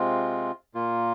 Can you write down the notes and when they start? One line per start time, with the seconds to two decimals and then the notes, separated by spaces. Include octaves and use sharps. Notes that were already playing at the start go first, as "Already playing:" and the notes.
Already playing: C3 G#3 C4 F4
0.75 A#2 A#3 F4